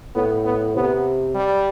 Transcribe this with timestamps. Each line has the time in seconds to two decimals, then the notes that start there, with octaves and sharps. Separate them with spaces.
0.15 A2 B3
0.45 B3
0.75 C3 B3
1.35 G3